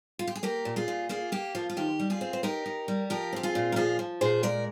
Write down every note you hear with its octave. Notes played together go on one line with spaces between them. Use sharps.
F4
G4
G#4
A#3 G4 A#4
A#2
F4 G#4
A#2
A#3 F4 G#4
A#3 G4
F3 F4
F4
D#3 G4
G3
F4 G#4
C4
C5
D#4 G4 A#4
D#4
G3
F3 G4 A#4
C4 G4
F4 G#4
A#2
A#4
F3 F4 G#4
F3
A#2 G#4 C5
G#3 A#4 D5